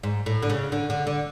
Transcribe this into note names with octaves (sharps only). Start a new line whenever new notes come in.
G#2
A2
D3
C#3
D3
D3
D3